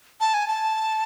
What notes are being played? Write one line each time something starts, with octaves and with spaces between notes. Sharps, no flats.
A5
G#5
A5